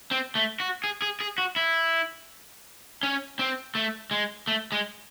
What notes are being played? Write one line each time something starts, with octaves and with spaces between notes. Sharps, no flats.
C4
A3
F#4
G#4
G#4
G#4
F#4
E4
C#4
C4
A3
G#3
A3
G#3